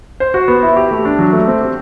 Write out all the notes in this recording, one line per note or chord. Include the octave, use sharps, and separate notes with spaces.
C5
F#4
B3
E4
G4
A3
D4
F#3
A3
C4
G4